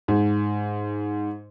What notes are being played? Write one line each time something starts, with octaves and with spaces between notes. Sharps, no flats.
G#2